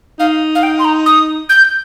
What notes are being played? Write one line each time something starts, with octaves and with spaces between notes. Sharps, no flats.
D#4 F5
F5
G5
C6
A#5
D#6
G6